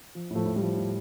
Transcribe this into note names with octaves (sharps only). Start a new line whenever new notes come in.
F3
A2 F3 A3
A2
G3
F3
A2